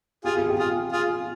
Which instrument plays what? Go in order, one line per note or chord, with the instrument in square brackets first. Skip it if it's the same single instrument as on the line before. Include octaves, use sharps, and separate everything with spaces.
[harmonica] F4 G#4 [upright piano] G4
[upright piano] G#4
G4
[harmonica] F4 G#4
F4 G#4